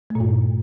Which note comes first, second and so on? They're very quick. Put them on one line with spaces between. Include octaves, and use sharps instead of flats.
A3 A#2 G2